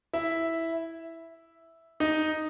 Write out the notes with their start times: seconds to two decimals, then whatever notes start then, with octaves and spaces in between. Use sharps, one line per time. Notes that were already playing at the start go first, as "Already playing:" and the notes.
0.13 E4 E5
2.00 D#4 D#5